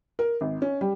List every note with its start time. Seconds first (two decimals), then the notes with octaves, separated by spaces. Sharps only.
0.19 A#4
0.41 G#1
0.62 C#4
0.81 G3